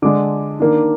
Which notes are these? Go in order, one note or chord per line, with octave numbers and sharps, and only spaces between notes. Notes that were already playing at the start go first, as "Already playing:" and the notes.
D3 G#3 D4 D6
D#3 A#3 D4